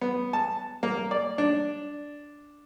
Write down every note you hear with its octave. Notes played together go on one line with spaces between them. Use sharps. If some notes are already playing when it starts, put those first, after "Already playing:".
B3
A5
A#3
D5
D4